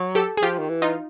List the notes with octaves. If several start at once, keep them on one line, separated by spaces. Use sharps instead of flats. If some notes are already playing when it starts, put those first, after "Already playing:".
Already playing: F#3
G4 A4
G#4
F3 F4 G4
D#3
E3
D#4 F4